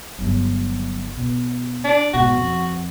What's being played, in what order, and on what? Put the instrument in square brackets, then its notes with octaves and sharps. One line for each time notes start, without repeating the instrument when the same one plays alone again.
[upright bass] G1 F#3
B2
[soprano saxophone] D4
[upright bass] G#2 B2 [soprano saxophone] F#4
[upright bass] F2